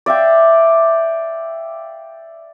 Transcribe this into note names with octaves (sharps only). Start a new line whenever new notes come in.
D5 E5 F5 G5